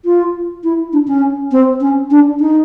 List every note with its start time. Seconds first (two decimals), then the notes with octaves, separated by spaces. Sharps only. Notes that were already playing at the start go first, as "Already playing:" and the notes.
0.05 F4
0.64 E4
0.93 D4
1.08 C#4
1.52 C4
1.81 C#4
2.11 D4
2.40 D#4